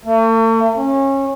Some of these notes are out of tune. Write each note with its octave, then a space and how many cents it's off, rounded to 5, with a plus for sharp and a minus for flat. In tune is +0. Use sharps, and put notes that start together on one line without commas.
A3 +45
C#4 -25